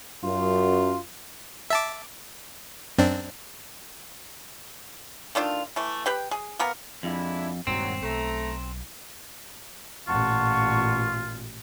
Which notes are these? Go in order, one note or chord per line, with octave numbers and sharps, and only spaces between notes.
F#2 F4
E5 A5 D6
F#2 C4 D4
D#3 A3 D4 F4
E3 A3
G4 B4 G5
G#4
A#3 B3 A#4
F2 G#3 D4 E4
D#1 G2 D#3 F#3 G#3 C4
B1 A3 A#5
A1 A#2 F4 F#5 A5 C#6